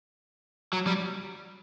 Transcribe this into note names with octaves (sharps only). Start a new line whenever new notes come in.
F#3
G3